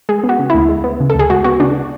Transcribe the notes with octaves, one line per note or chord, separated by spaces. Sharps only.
G#3 G#4
B3
F#4
C#3
D2 E4
G#3
B3
C#3
A4
D2 G#4
G#3 F#4
B3 F#4
C#3 D4